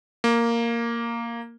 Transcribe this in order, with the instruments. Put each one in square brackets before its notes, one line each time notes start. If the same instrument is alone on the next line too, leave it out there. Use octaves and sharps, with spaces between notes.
[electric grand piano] A#3